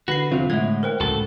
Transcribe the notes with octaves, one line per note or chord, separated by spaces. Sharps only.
D3 F#4 B4 A#6 C7
E2 C3 F#3 C4 F4
A2 G#3 E5 F#5 G#6
A#4 C5 G5
C#2 A2 F#4 A4